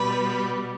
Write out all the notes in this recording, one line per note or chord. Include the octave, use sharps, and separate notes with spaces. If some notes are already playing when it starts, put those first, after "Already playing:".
Already playing: B2 G3 B4